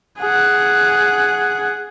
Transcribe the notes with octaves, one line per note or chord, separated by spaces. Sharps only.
G#4 F#5